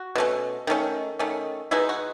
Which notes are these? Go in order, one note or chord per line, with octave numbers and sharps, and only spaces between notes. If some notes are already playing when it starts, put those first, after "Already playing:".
Already playing: F#4
B2 A3 C#4
D#3 A3 C#4
D#3 A3 C#4
B2 G#3 B3 D#4 E4
F#4